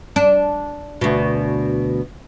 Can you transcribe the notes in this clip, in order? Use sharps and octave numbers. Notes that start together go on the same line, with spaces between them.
D4
D2 B2